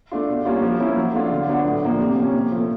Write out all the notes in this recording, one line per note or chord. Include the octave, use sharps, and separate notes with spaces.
A3 D4 F4
B2
G3 A#3 C#4 F4
F3
A#3 C#4 E4
F#3
A3 D4 F4
D3
F#3 B3 D4
A2
F3 A#3 D4
C3
F3 A#3 C#4
A#2
F3 A3